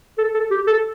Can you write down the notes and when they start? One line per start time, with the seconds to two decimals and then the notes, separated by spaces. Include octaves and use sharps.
0.18 A4
0.34 A4
0.51 G4
0.67 A4